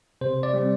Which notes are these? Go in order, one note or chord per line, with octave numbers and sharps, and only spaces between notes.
C3 C5
D5
G3 C4